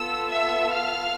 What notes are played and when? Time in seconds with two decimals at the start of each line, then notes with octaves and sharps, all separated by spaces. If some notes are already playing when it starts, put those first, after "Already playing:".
Already playing: B3 F4 A4 E6
0.30 E5 E6
0.71 F5 F6